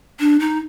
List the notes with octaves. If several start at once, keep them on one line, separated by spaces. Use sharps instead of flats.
D4
D#4